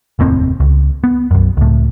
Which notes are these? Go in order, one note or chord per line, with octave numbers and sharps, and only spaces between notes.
F1 D#2 A2 C4
C#2
B3
B1 F#2
C#2 A2